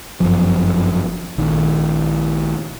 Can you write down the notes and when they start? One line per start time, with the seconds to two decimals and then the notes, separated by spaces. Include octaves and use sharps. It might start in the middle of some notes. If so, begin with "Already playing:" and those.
0.20 G1 F#2 F3
1.38 A#1 D#3